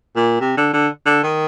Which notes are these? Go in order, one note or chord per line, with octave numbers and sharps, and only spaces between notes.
A#2
C3
D3
D3
D3
D#3